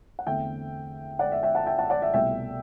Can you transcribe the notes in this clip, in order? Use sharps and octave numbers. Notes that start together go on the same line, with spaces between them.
F#5
E2 D3 A3 C4 E5 G5
D5 F#5
E5
E5 G5
F#5 A5
E5 G5
F#5 A5
D5 F#5
E5
C2 B2 A3 E5 G5